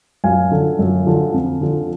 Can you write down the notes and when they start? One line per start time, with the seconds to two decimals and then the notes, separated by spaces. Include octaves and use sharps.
0.24 F#2 F5 G#5
0.51 D3 F3
0.79 F#2
1.06 D3 F3
1.34 F2
1.61 D3 F3